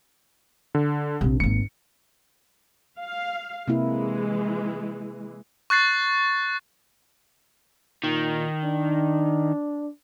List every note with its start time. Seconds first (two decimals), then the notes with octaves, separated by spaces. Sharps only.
0.75 D3
1.21 A#1 C3
1.40 G#1 A#3 C#7
2.99 F5
3.68 C3 E3 G#3 A#3 E4
5.70 C#6 F#6 A6 C7
8.04 A#2 D#3
8.64 D4